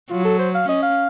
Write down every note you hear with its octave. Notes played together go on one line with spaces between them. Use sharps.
F#3 F4
A4
C5
F5
C#4 D#5
F5